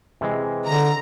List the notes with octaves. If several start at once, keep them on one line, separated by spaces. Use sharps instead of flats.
C3 E3 G#3
D3 A#5